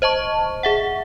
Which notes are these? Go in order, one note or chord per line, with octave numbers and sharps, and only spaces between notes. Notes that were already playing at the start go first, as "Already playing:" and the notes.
C5 D#5 A5 C#6
G#4 E5 F#5